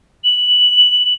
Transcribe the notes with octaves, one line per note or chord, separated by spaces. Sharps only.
F#7